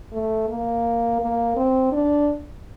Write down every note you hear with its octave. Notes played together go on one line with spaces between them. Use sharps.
A3
A#3
A#3
C4
D4